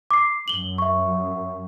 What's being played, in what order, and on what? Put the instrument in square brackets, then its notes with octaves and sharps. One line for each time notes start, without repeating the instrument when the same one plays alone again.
[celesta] D6 C7
[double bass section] F#2 [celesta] F#7 G7
[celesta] E5 C#6